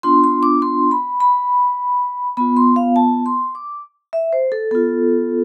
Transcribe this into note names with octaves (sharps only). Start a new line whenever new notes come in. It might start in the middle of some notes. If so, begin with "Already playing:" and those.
B3 D4 F4 C6
C6
D6
C6
B5
B5
B3 F4 B5
C6
F5
A5
C6
D6
E5
C5
A4
B3 F4 A4